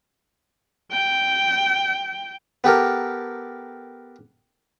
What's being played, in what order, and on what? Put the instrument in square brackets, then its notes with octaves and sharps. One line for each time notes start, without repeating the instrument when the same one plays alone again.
[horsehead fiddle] G5
[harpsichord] B3 G4 A4 A#4